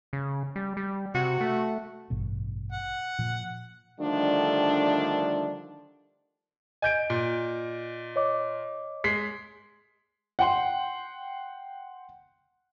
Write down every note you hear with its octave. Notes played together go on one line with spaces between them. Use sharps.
C#3
G3
G3
C3 F#4
A3
A1 G2 B2
F#5
A#2 F3
D3 D#3 F3 G3 A3 D4
D#5 G#5 G6 D7
A#2
C#5 D#5 D6
G#3 B6 C7
F#5 G5 C6